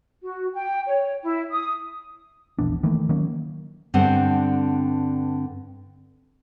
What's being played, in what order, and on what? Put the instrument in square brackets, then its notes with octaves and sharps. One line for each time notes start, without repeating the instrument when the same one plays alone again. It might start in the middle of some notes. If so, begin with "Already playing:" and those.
[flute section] F#4
G5
C#5
E4
D#6
[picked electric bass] E1 A#1 E2 D4
D#3 E3 A3 A#3
D#3 F#3 A#3 C#4
[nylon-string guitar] G2 D3 B3 C4 A4 F#5